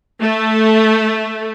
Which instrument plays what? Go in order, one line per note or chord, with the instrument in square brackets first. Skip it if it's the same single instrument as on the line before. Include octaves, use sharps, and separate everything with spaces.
[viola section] A3